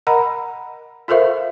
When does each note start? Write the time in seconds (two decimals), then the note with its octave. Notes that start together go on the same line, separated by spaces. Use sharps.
0.07 A#4 D#5 F#5 A#5 B5
1.08 F4 A4 A#4 C5 E5 F5